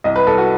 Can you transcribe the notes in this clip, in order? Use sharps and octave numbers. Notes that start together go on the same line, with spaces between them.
C2 D#5
B4
C2 A4
F#4